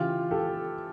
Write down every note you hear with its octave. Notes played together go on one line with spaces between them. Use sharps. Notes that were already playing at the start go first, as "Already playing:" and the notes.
Already playing: C#3 E3 F4 G4
G4 A4